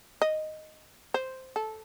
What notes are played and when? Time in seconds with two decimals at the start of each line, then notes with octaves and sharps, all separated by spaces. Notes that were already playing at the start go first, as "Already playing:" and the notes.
0.22 D#5
1.14 C5
1.56 A4